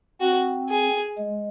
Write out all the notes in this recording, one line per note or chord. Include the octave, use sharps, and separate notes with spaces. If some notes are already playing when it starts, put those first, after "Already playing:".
C4 F#4
G#4
G#3